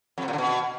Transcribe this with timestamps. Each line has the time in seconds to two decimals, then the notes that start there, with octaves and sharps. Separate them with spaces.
0.18 F2
0.23 C3
0.28 A#2
0.33 D3
0.38 B2